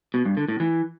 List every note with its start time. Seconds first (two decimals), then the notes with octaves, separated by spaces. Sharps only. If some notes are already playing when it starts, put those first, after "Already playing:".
0.14 B2
0.25 G2
0.37 D3
0.48 A2
0.60 E3